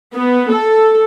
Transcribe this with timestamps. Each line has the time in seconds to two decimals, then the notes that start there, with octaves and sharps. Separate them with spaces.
0.14 B3
0.52 A4